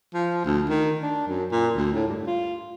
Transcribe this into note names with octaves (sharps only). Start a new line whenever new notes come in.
F3
D2
D#3
D4
F#2
A#2
D2
A2
G2
F4